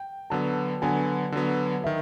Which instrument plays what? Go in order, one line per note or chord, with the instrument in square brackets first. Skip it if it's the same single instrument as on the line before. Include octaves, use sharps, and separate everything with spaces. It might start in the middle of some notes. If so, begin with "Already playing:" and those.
Already playing: [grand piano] G5
[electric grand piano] D3 F#3 B3 [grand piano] A5
[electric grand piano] D3 F#3 B3 [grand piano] G#5
[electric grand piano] D3 F#3 B3
[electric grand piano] D#3 [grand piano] E5